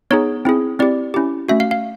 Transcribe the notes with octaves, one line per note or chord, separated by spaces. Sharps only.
B3 D#4 G#4 C#5
C4 E4 G#4
C4 E4 G4 D5
C#4 E4 G4
A3 C#4 F#4 E5
F5
F5